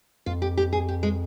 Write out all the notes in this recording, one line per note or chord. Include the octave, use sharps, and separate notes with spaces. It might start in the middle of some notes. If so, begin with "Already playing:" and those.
F2 F4
G4
G4
G#4
G4
G#3